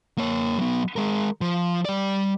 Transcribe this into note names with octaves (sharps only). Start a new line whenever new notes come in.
A#3 C#5
F#3 B3
G#3 A#4
F3
G3 D5